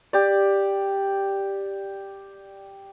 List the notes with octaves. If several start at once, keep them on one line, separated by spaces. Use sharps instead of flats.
G4 D5